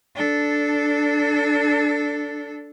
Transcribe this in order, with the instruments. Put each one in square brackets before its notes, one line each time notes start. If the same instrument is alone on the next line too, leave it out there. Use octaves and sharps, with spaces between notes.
[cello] D4 A4